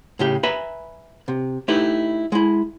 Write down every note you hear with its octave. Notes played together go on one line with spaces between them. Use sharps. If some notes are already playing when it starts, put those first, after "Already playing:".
A2 C#3 G4
B4 E5 G#5 A#5 B5
C3
A3 D#4 E4 G4 B4
G#3 E4